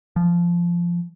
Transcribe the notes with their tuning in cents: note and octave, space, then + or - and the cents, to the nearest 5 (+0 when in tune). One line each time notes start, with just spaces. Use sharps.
F3 -15